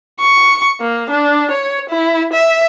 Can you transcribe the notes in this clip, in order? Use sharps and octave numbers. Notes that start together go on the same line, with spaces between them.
C#6
A#3
D4
C#5
E4
E5